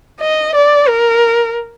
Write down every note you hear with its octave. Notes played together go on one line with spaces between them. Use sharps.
D#5
D5
A#4